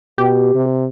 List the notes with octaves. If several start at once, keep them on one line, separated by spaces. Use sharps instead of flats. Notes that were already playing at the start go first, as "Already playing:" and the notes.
B2 G4
C3